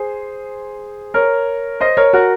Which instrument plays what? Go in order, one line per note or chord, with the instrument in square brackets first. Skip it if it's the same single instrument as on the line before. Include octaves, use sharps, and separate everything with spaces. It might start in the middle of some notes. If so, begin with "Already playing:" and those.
Already playing: [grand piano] G#4 C5
A#4 C#5
C5 D#5
A#4 C#5
F#4 A#4